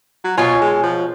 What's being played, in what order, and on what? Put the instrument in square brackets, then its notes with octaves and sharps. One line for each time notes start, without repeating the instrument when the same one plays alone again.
[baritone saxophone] F#3
[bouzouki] B2 C#5 G#5 [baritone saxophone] F4
[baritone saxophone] G#3
F3